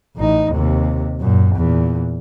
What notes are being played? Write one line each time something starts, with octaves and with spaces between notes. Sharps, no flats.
A1 D#4
D#2 C3
F#2 A#2
E2 A#2